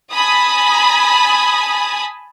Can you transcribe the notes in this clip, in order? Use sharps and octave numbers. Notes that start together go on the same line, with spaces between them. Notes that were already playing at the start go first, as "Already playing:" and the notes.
G#5 A5 B5 D#6